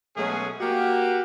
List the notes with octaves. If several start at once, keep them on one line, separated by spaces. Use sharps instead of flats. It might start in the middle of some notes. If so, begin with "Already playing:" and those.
B2 F#3 G#3 A3 C#4 G#4
A#3 F#4 G4